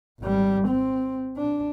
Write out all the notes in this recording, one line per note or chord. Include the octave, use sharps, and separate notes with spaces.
G#1 G3
C4
D4